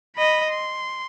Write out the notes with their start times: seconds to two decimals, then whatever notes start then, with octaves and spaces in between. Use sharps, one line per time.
0.16 D#5 B5
0.50 C6